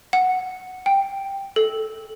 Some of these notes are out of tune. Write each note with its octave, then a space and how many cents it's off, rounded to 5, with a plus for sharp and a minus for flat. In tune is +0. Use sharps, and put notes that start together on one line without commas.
F#5 -5
G5 +5
A4 -10